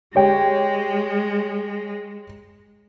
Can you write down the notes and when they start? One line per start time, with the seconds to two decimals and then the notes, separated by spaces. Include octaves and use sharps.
0.15 G#3 G4 C#5 G5